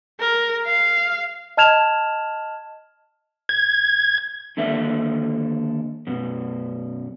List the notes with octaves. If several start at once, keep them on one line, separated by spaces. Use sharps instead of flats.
A#4
F5
D#5 A5 F6 G#6 E7 F7
G#6
D3 D#3 A#3 A4 E5
F#2 B2